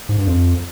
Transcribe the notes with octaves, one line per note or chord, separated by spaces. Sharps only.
G#2
G2
F2